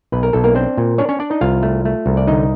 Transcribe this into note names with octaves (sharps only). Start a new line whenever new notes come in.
B1 B4
A#4
B1 A4
A#3 A#4
C4 D4 C5
A#2
C#4 D4 C#5
C#4 C#5
D4 D5
D#4 D#5
C2 F4 F5
A3
A3
C2
D5
D3 D#4 D#5